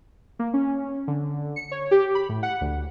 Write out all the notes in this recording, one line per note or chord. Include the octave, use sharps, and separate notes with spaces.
A#3
C#4
D3
C#7
C#5
G4
B5
A2
F#5
D2